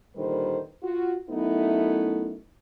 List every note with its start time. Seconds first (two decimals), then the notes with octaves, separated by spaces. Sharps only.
0.16 A#2 D3 D#3 G3 B4 C5
0.83 F4 F#4
1.30 F#2 A3 B3 D#4 E4